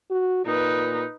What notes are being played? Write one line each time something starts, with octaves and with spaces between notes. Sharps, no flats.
F#4
A#2 D#4 B4